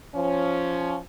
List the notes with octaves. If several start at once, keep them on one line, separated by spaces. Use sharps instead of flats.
F3 C#4